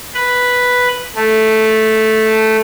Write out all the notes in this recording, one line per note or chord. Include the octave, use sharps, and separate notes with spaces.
B4
A3